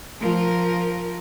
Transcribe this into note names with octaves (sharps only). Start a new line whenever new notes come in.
F3 A#4